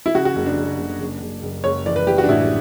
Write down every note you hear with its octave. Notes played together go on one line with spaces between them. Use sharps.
E4
C#3 F#4
F#4
F#1
D4
F#1
F#1
F#1
F#1
F#1
F#1 C#5
E3 D5
B4
E3 G4
F#4
D4
A1 E4